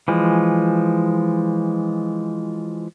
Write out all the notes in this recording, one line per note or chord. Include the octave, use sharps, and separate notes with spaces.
E3 F3 G#3